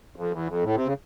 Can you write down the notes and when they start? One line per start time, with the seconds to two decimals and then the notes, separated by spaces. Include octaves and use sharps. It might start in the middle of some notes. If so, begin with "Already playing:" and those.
0.16 F2
0.31 E2
0.48 F2
0.63 A2
0.75 C3
0.86 C#3